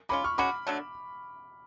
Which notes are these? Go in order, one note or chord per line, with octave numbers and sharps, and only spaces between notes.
G#3 C#4 F4 B5 D6
C#6 F6
G#3 C#4 F#4 B5 D6
D3 F#3 A3